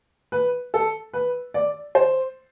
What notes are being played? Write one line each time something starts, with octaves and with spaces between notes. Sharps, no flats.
B4
A4
B4
D5
C5